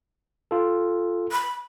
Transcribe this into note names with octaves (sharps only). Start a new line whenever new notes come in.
F4 A4
B5